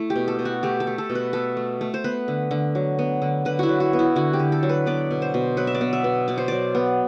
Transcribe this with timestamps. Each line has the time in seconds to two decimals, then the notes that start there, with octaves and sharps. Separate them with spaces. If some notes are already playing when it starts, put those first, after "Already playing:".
Already playing: A3 E4
0.10 G4
0.16 B2
0.28 A4
0.39 B2
0.45 F#4
0.63 A3 G4
0.80 A4
0.87 A3
0.98 A4
1.10 B2
1.15 B4
1.33 B2 A4
1.57 A3
1.81 A3
1.94 C5
2.04 B3 B4
2.28 D3
2.51 D3
2.75 F#3
2.99 B3
3.22 D3
3.45 D3 B4
3.59 E4 F#4
3.69 F#3
3.80 F#4
3.93 B3
3.99 E4
4.16 D3 F#4
4.33 G4
4.39 D3
4.52 A4
4.63 F#3
4.69 B4
4.86 B3 D5
5.11 B2
5.22 C5
5.34 B2
5.57 F#3 B4
5.67 E5
5.75 D5
5.81 B3
5.93 E5
6.04 B2
6.28 B2 D5
6.38 C5
6.48 F#3 D5
6.75 B3